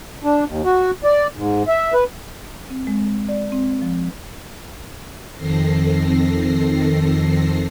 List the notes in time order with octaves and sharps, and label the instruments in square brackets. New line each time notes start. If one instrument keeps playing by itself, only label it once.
[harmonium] D4
D#2
F#4
D5
G#2
E5
B4
[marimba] C4
G#3
D5
C4
F3
[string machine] F2 D#3 C4 A4 A#6 C7